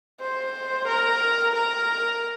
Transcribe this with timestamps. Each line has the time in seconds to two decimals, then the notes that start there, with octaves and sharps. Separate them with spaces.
0.21 C5
0.88 A#4
1.55 A#4